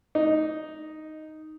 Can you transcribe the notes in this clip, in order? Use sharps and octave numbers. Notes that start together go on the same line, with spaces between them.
D#4